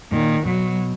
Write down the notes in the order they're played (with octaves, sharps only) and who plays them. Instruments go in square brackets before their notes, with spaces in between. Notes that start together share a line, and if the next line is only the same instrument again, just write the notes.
[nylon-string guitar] A#2 [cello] D#3
[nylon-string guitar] B2 [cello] F#3